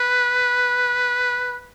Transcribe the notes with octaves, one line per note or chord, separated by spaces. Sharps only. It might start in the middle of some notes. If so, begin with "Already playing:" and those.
Already playing: B4